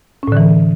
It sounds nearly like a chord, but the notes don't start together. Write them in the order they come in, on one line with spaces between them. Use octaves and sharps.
C#4 A2 D3 E3